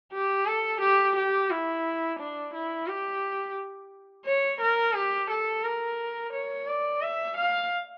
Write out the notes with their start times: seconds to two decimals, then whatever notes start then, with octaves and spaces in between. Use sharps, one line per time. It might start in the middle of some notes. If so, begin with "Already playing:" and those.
0.12 G4
0.46 A4
0.81 G4
1.16 G4
1.50 E4
2.19 D4
2.54 E4
2.88 G4
4.26 C#5
4.61 A#4
4.95 G4
5.30 A4
5.64 A#4
6.33 C#5
6.67 D5
7.02 E5
7.37 F5